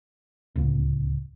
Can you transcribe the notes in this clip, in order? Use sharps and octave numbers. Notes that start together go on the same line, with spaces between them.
D1 C#2